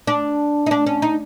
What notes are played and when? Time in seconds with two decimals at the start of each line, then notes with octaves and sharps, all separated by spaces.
0.07 D4
0.66 D#4
0.71 D4
0.86 C#4
1.02 D#4